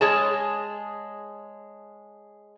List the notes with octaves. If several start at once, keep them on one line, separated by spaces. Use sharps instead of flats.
G#3 G#4 C#5 A5